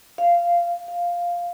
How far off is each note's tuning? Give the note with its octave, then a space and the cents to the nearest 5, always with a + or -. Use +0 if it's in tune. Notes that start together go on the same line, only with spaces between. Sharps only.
F5 -15
F5 +0